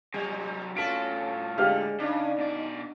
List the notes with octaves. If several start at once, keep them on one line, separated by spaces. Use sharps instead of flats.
C3 F#3 G3
A2 C#4 F4 F#4 A4 B6 D7
D3 G#3 G4 F5 F6
C#3 D4 D#4
B2 D5